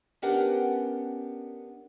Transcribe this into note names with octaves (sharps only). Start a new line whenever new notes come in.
B3 C#4 D4 G4 A#4 F#5